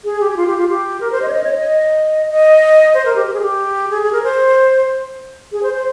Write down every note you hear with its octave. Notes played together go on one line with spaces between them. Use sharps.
G#4
G4
G4
F4
G4
F4
G4
A#4
C5
D#5
C#5
D#5
C#5
D#5
D#5
C5
A#4
G4
G4
G#4
G4
G#4
G#4
A#4
C5
G#4
C5
C5